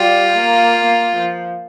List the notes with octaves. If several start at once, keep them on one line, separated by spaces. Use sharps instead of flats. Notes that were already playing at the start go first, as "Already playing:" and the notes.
Already playing: G3 F4
A#3
A#3
F3